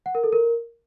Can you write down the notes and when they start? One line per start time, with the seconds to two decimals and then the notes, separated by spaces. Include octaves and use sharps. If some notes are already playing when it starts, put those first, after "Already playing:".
0.06 F#5
0.15 A#4
0.24 A4
0.33 A#4